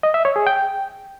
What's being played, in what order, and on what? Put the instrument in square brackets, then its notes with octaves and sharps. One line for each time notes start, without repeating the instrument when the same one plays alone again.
[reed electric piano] D#5
E5
C#5
G#4
G5